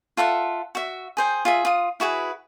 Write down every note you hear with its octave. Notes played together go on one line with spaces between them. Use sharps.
F4 A4 E5 F#5
F#4 E5
G#4 C5 G5
F4 G#4 E5
F4 D#6
E4 F#4 G#4 B4